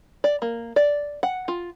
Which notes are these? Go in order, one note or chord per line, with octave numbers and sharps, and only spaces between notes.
D5
A#3
D5
F#5
F4